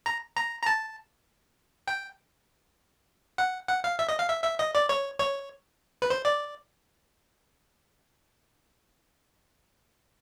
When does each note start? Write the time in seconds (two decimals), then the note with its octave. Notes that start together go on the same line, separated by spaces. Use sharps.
0.06 A#5
0.37 A#5
0.62 A#5
0.66 A5
1.88 G5
3.38 F#5
3.68 F#5
3.84 F5
3.99 E5
4.09 D#5
4.19 F5
4.29 E5
4.44 E5
4.59 D#5
4.75 D5
4.89 C#5
5.19 C#5
6.02 B4
6.10 C5
6.25 D5